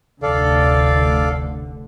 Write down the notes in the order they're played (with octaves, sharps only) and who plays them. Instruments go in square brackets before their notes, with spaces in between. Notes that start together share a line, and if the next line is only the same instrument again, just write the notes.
[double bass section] F1 D2 D3 [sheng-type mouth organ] A4 D5 F5